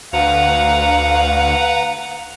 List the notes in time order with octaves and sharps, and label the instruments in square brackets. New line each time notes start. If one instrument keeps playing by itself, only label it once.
[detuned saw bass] D2 [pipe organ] B4 F#5 A#5 [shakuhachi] F5